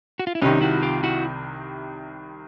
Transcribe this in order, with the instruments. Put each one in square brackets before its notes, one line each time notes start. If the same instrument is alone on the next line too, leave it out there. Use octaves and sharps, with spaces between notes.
[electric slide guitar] F#4
F4
E4
[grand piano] C2 C3 D#3 [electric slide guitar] C#4 D#4
[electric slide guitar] E4 F#4
F4 G4
E4 F#4